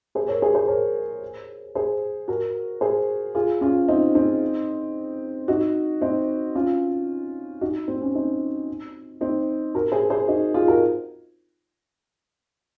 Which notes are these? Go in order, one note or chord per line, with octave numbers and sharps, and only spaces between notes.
G#4 C5
A#4 C#5
G#4 C5
G#4 C5
A#4 C#5
G#4 C5
F#4 A#4
G#4 C5
F4 G#4
C#4 F4
C4 D#4
C4 D#4
D#4 F#4
C4 D#4
C#4 F4
D#4 F#4
C4
C#4
C4 D#4
C4 D#4
F#4 A#4
G#4 C5
G#4 C5
D#4 F#4
F4 G#4
F#4 A#4